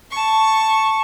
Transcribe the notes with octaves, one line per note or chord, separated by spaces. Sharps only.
A5 C#6